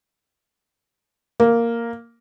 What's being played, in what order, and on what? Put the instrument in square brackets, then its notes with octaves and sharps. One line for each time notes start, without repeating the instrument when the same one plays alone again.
[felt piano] A#3